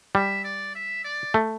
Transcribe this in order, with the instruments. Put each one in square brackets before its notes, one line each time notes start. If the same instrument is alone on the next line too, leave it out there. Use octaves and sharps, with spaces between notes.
[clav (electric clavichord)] G3 [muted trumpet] E5
[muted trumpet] D5
E5
D5
[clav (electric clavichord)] A3